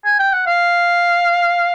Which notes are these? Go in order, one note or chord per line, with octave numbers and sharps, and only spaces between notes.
G#5
G5
F#5
F5